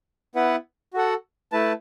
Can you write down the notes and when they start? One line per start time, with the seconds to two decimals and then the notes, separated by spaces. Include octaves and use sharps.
0.35 B3 E4 B4 F#5
0.93 F#4 A4 F#5
1.52 A3 E4 B4 A5